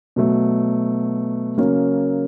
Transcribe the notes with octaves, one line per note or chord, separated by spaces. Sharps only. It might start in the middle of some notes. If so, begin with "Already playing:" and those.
B2 F#3 A3
C#3 F#3 A#3 C#4